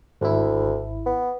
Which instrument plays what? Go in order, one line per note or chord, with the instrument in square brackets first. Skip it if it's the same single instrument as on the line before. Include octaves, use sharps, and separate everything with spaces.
[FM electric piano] G#1 E4 [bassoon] D2
[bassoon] B3